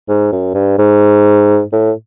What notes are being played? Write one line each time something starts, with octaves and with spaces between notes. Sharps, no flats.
G#2
F#2
G2
G#2
A2